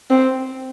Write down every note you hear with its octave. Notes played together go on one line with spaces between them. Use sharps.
C4